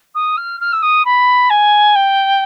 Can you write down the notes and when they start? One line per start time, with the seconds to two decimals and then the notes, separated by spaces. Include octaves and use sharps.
0.14 D#6
0.37 F6
0.60 F6
0.72 E6
0.82 D#6
1.05 B5
1.50 G#5
1.95 G5